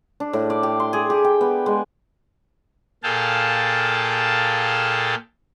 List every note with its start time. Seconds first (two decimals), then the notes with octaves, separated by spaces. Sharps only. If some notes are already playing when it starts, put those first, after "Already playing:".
0.20 D4
0.33 A2
0.50 D5
0.63 G4
0.80 C6
0.93 G#4
1.10 G4
1.24 G5
1.41 B3
1.66 G#3
3.03 A#2 G#4 A4 F5 G5 A5